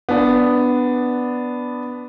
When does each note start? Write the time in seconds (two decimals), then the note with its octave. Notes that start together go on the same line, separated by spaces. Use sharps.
0.09 B3 D4